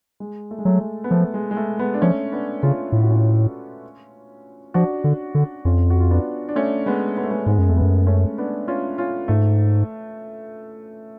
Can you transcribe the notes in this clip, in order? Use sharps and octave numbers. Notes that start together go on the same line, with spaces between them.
G#3
A3
G#3
F#3 A3
G#3
B3
F3 A3
G#3
G#3
A3
G#3 B3
D4
F3 A3 C#4
B3 D4
C#3 C#4 F4
A2 F4
F#4
C#4 F4
F3 D4 F#4
D3
D3
F2 C#4 F4
F#4
F4
B3 D4
D4
A3 C#4
G#3 B3
B3
A3
G#3 B3
G#2 G#3 B3
F#2
F2 A3
F#2 G#3 B3
A3 C#4
B3 D4
C#4 F4
C#4 F4
G#2 A3